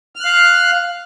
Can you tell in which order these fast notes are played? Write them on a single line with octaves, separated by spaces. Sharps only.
F6 F#6 F5